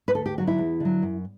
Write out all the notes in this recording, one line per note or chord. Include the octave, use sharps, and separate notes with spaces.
B4
D2 A4
G4
D3 F#3 F#4
E4
E2
D3 F#3
F#2